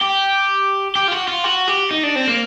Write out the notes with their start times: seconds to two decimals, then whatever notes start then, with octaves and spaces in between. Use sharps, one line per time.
0.01 G4
0.96 G4
1.08 F4
1.12 F#4
1.28 F4
1.44 F#4
1.68 G4
1.91 D#4
2.03 D4
2.16 C4
2.28 A#3